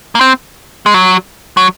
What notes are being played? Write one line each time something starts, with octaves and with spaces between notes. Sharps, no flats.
A#3
C4
G#3
F#3
F#3